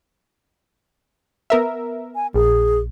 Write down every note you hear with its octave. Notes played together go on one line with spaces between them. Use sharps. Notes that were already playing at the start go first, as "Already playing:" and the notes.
B3 A#4 E5
G#5
A#1 G#4